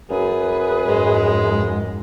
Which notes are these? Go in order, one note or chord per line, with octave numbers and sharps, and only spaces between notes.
F#2 G#4 B4
F2 G#2 G#3